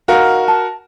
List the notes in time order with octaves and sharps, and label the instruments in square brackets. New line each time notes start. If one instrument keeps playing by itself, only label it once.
[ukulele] D#4 F5 [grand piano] F#4 A#4
[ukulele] A5